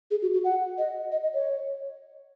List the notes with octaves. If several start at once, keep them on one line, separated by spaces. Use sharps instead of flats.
G#4
F#4
F#4
F#5
D#5
D#5
D#5
C#5